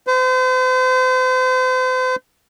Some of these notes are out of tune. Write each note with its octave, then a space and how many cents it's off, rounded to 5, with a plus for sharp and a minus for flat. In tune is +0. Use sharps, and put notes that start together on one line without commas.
C5 -40